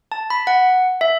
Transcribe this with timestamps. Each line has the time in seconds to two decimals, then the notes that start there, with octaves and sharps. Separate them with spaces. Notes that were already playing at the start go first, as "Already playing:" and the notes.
0.12 A5
0.30 B5
0.47 F#5
1.01 E5